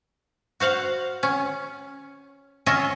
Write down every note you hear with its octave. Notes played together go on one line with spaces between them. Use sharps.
F#4 C5 F5 F#5
C#4
C#4 F4 D#5 E5